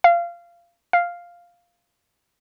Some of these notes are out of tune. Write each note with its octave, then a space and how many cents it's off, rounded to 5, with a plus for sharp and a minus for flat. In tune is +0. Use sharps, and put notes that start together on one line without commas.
F5 -20
F5 +0